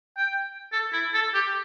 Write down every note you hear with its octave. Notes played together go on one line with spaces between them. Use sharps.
G5
A4
E4
A4
G4